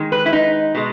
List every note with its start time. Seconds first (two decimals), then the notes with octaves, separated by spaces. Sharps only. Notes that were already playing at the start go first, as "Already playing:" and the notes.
Already playing: D#3 G#3
0.12 B4
0.26 E4
0.33 D#4
0.75 B2 G#3